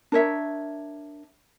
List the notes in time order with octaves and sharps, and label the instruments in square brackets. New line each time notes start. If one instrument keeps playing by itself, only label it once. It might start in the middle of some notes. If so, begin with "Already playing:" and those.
[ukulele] D4 A#4 C#5 E5